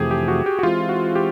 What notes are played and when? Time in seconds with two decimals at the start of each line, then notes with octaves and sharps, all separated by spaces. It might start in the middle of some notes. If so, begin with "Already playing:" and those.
Already playing: F2 C3 E3 A3 G4 G#4
0.11 G4
0.28 F#4
0.46 G4
0.59 F#4
0.63 E3 G#3 C4 F4
0.89 F#4
1.15 G4